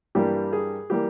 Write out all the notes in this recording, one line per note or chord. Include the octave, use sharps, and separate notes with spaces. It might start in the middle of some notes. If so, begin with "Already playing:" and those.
G2 E3 G3 A#3 G4
G#4
E3 G3 A#3 G4